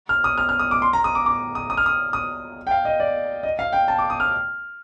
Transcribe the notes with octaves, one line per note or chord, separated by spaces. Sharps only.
F6
D#6
F6
F6
D#6
D6
C6
A#5
D#6
D6
D6
D#6
D#6
F6
D#6
D#6
G5
F5
D#5
D5
D#5
F5
G5
A5
D6
D#6
F6